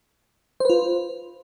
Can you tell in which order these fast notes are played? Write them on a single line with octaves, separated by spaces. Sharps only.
C5 B4 F4